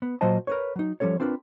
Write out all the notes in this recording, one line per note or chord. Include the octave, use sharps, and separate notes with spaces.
B3
A#2 F#3 F4 C5 D#5 A5
A#4 B4 C#5
F#3 D#4
F3 G3 C#4 A4 C#5
C4 D4 F4 A#4 B4